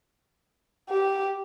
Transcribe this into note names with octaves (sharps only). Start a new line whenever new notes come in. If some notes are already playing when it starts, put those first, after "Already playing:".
G4